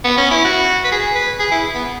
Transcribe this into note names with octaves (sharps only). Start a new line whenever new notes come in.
B3
C#4
E4
F#4
B4
G#4
B4
G#4
E4
B3